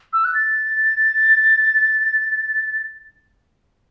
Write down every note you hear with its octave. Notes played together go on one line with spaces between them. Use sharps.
E6
F#6
A6